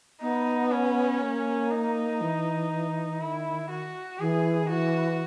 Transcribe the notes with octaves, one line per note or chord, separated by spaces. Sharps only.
B3 D#4
C#4
A#3
D#4
E3
D#3 E4
F#4
E3 G#4
D#3
E3 F#4